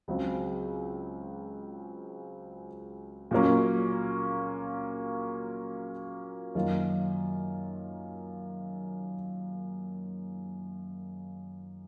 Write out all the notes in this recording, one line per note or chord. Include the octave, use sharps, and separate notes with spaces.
C#2 C#3 F#3 C4
A#2 F#3 A#3 C#4
F#2 D#3 A#3 F4